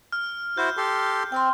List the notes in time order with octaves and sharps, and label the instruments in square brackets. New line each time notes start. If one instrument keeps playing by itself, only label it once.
[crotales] F6
[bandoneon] E4 F#4 C5 [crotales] G6
[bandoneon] G4 A4 C6
[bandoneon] C4 [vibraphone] G5 C6